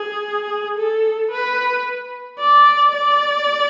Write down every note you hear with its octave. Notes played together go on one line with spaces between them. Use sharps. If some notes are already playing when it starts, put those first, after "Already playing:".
Already playing: G#4
A4
B4
D5
D5